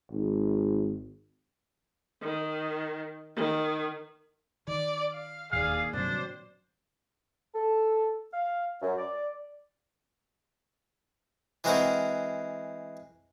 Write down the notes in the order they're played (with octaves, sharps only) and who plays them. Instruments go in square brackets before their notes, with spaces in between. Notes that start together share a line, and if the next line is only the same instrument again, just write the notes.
[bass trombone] G#1
[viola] D#3
D#3
[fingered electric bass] D#3 [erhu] D5
[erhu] F5
[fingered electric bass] E1 D#2 [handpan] A#2 D#3 D5 [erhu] G#4 [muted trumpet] F5
[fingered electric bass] G2 C3 G3 [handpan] F#3 C4 D5 [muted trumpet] D4 [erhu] C5
[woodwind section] A4
F5
F#2
D5
[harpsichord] E3 G#3 C4 F#4 A#4 C5